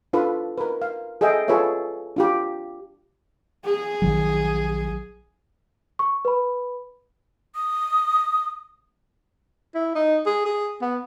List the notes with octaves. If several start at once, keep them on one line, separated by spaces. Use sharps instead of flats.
D4 F4 A4 B4
A#4 B4
F5
G#4 A4 D#5 E5 G5
F4 G#4 A4 B4 C#5 E5
D4 F4 G4
G#4
A#1 D#3 F#3
C#6
B4 B5
D#6
E4
D#4
G#4
G#4
B3